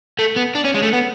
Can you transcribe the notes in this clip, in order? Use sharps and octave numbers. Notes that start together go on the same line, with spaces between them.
A3
B3
D4
C#4
G#3
A3
B3